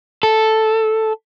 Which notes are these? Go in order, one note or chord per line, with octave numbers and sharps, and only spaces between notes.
A4